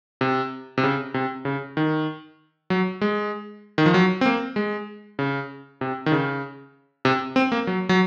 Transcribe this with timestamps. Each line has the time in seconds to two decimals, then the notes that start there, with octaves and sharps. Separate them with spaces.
0.21 C3
0.78 C3
0.84 C#3
1.14 C3
1.45 C#3
1.77 D#3
2.70 F#3
3.01 G#3
3.78 D#3
3.86 F3
3.94 F#3
4.21 C4
4.26 A#3
4.56 G#3
5.19 C#3
5.81 C3
6.06 D#3
6.12 C#3
7.05 C3
7.36 C4
7.52 A#3
7.67 F#3
7.89 F#3